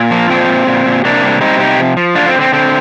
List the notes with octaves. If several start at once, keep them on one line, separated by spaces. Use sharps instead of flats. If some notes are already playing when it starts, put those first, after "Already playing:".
Already playing: A#2
F3 A#3
A#2 C4
A#2
A#2
A#2
C3 A#3 D4
G3
G3 C4 D#4
C3 D#4 G4
F3
F3
D3 D4 F4
C4
D3
C4
D3 C4